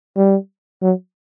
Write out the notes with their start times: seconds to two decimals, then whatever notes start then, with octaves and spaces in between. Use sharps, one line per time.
0.16 G3
0.82 F#3